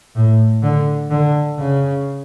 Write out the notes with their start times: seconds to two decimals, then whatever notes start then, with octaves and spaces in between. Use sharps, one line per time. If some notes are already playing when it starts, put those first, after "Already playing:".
0.15 A2
0.63 D3
1.10 D3
1.58 C#3